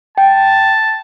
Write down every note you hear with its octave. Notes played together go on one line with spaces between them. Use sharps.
G5 A5